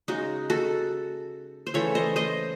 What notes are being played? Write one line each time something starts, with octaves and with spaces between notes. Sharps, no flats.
C#3 G#3 D#4 F#4
F#4 A4
C5
C#3 E3 A3 A4 C#5
C5 D#5
C5 D#5